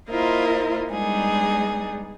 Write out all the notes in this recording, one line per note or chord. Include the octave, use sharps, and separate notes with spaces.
A#3 E4 F4 A#4 C5 D#5
G3 G#3 B3 D4 D#4 G#4